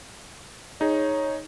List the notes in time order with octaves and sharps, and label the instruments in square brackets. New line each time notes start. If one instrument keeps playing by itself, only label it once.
[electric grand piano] D#4 G#4 [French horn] C#5